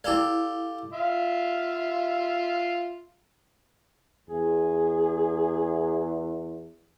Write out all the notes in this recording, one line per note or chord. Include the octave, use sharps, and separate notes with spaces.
E4 G4 A4 D5 F5
F4 E5 F5
E2 G#4